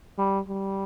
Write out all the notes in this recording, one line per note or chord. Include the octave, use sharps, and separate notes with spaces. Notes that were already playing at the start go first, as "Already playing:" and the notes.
G3
G3